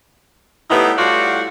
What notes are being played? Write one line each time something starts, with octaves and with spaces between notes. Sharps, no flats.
A2 G3 B3 D#4 E4 G4
A2 G3 F4 F#4 D5 F#5